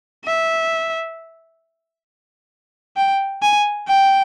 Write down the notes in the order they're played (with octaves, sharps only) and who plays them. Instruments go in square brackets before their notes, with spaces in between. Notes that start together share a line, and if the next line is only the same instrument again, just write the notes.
[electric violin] E5
G5
G#5
G5